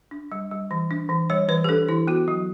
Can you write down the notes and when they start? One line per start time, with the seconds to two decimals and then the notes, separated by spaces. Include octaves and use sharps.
0.11 D4
0.32 G3
0.51 G3
0.71 E3
0.91 D4
1.09 E3
1.30 G3 C#5
1.48 E3 B4
1.64 G4
1.69 D4 A4
1.88 E3 E4
2.07 B3 F#4
2.28 F#3